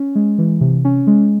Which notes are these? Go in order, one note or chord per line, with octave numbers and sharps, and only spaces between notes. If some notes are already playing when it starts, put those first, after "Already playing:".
Already playing: C#4
G#3
E3
C3
C#4
G#3